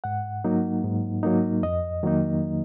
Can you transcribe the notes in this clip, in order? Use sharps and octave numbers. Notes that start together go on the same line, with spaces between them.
G#2 F#5
F#3 A#3 D#4
G#2
F#3 A#3 D#4
F2 D#5
D#3 F#3 A#3 D#4